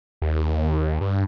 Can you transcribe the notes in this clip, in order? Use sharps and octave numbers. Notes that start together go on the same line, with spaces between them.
D#2
G2